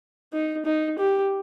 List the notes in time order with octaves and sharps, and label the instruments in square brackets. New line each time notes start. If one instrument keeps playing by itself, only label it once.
[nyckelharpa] D#4
D#4
G4